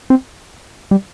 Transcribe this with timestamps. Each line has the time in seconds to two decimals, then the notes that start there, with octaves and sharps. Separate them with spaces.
0.10 C4
0.91 G3